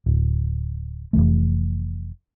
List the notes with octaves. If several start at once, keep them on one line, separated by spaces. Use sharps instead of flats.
D1
F1 E2 E3 A3